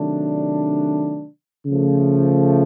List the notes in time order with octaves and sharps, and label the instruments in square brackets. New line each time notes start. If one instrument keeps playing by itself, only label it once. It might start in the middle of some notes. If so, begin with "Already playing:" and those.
Already playing: [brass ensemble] C3 D#3 F#3 A3 D4
C#3 F3 A3